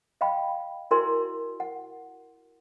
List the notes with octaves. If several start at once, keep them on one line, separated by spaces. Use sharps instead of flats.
D#5 F5 G5 B5
E4 F#4 A#4 D5 G#5 C6
F#5